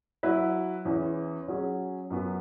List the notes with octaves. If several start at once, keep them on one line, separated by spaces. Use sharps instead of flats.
F#3 E4 B4
E2 E3 C#4
F#3 C#4 G#4
F#2 F#3 B3 F#4